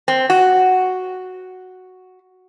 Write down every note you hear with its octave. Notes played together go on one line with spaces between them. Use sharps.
C4
F#4